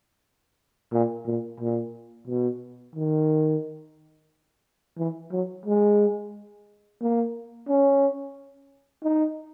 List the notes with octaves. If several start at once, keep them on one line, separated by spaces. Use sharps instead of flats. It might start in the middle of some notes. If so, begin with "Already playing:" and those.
A#2
A#2
A#2
B2
D#3
E3
F#3
G#3
A#3
C#4
D#4